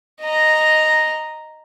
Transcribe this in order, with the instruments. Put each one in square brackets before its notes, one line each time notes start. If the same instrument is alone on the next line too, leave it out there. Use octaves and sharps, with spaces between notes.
[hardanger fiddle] D#5 A#5